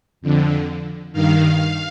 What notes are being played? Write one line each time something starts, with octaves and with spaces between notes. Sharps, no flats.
F2 D3
G2 D#3 F5